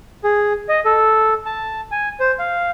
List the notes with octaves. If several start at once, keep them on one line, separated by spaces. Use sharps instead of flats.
G#4
D#5
A4
A5
G#5
C5
F5